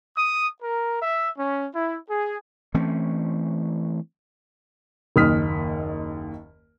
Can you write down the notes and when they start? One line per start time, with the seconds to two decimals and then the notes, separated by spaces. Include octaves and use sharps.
0.17 D#6
0.63 A#4
1.02 E5
1.37 C#4
1.74 E4
2.09 G#4
2.74 E3 A3 C4 C#4
5.16 F#1 D#2 D#6 F6 B6